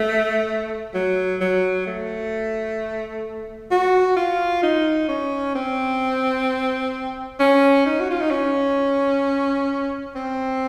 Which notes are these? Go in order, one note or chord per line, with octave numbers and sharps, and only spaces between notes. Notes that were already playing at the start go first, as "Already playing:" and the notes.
Already playing: A3
F#3
F#3
A3
F#4
F4
D#4
C#4
C4
C#4
D#4
F#4
F4
D#4
C#4
C4